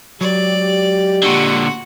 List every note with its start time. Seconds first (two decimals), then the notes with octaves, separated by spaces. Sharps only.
0.21 F#3 G#3 G4 D5
1.23 A#2 D3 F#4 F#5